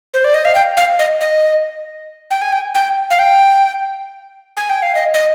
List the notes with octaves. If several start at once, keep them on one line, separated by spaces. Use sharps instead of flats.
C5
D5
D#5
F5
G5
F5
D#5
D#5
G5
G#5
G5
G5
F5
G5
G#5
G5
F5
D#5
D#5